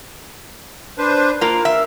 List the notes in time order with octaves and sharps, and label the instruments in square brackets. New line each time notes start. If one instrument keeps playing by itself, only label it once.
[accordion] D4 B4 C5
[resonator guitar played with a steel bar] A#3 F4 [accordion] A#4
[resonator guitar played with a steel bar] E5